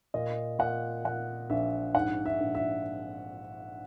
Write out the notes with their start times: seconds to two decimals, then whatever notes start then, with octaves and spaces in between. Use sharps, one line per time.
0.14 A#2 D#5
0.59 A#2 F#5
1.05 A#2 F#5
1.50 A#1 E5
1.95 G#2 F#5
2.26 E5
2.41 A#1
2.55 E5